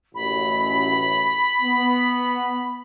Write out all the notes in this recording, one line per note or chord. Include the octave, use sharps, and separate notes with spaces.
A1 F#2 B5
B3